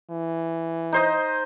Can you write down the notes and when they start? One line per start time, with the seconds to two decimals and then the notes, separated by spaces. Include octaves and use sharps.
0.10 E3
0.92 D#4 C5 D#5